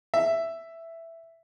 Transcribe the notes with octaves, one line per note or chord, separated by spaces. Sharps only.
E5